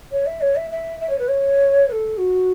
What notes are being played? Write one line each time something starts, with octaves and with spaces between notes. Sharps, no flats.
C#5
E5
C#5
E5
E5
E5
C#5
B4
C#5
B4
A4
F#4